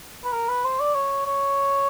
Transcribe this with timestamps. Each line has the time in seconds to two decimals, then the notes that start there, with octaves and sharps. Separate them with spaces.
0.25 B4
0.32 A#4
0.49 B4
0.64 C5
0.80 D5
0.95 C#5
1.27 C#5